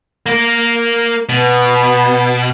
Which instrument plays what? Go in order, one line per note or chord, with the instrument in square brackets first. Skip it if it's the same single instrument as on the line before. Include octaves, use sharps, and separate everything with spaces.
[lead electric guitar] A#3 A#4
[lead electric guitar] B2 [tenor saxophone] B3